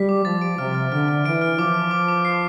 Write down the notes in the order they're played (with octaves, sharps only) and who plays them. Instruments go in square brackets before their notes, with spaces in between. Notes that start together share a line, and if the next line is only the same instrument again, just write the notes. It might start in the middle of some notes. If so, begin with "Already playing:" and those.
Already playing: [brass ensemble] G3 [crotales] B6
[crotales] D6
[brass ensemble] F3 [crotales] A6
[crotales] D7
[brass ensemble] C3 [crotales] F6
[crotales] F6
[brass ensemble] D3 [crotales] F6
[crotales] F6
[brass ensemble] E3 [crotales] D7
[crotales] F6
[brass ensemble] F3 [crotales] D6
[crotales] F6
D6
D6
C7